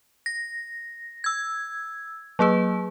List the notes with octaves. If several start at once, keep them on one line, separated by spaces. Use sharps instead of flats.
A#6
E6 G#6
F#3 A#3 G#4 B4